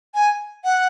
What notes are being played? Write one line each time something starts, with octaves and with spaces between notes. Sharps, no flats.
G#5
F#5